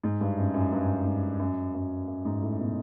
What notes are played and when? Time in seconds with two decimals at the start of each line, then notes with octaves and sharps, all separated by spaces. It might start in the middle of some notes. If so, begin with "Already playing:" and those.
0.03 G#2
0.21 G2
0.38 F#2
0.54 F#2
0.72 G2
1.05 G#2
1.39 F#2
1.74 F#2
2.07 F#2
2.25 G#2
2.42 A2
2.59 B2